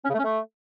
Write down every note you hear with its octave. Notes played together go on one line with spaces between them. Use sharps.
C#4
C#3
A3
C#4
A3